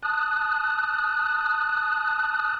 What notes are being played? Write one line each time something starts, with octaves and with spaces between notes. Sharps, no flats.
A5 D#6 F#6